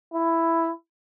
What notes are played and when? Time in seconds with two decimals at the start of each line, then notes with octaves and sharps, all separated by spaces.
0.14 E4